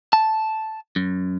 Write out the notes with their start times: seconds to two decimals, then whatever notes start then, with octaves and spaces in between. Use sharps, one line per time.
0.13 A5
0.96 F#2